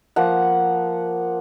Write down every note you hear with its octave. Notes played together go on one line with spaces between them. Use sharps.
F3 A#3 F#5